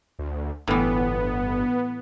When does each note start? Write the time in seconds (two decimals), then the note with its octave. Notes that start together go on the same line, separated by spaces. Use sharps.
0.19 D2
0.67 G1 A2 E3 B3